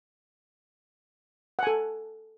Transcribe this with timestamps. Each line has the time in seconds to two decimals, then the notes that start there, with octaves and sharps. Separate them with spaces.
1.59 F#5
1.63 G#5
1.67 A4